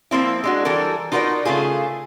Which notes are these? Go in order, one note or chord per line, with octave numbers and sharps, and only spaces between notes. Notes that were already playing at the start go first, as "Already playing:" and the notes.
F3 A#3 C4 E4
G#3 D4 F#4
E3 G3 A4 A#4
D#4 F4 F#4 A#4 B4 D5
C#3 A3 F4 G#4